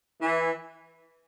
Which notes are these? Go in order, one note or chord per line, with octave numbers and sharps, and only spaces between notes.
E3